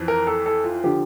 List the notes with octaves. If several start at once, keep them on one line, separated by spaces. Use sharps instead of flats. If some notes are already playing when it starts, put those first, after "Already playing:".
Already playing: F2 E3
A#4
A4
A4
F4
D3 F3 G4